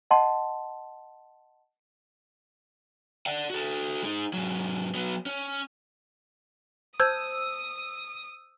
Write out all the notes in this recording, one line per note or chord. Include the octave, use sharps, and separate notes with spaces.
D#5 F#5 A5 C6
D5 F#5
F#4 A4
G#3 D#4
G#2 F#3
F#3 B3
C#4
C5 A5 D#6 E6 G6 G#6